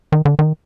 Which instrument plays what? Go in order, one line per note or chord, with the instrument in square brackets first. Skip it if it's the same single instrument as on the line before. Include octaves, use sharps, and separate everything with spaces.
[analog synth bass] D#3
D3
D#3